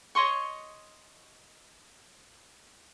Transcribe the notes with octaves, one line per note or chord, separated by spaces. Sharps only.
C#5 D#5 C6 C#6